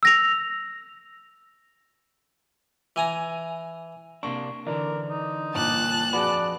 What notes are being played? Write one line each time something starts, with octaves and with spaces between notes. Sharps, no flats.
E6 A#6 F7
E3 G#5 A#5
C3 A#3 D4 C#6
D3 E3 D4 A#4
D#4
G1 A#2 A5 D6 F#6
F2 F#4 G#4 B4 D5